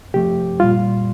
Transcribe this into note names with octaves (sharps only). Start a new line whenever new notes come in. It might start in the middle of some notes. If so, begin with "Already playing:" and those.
C3 F3 A3 G4
A#2 G3 F4